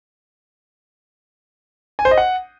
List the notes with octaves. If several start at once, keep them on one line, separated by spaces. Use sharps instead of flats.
G#5
C5
D#5
F#5